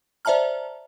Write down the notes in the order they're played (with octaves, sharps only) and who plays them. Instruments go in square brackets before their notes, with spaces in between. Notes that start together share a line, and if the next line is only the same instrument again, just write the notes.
[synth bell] C5 D5 E5 A5 A#5 F6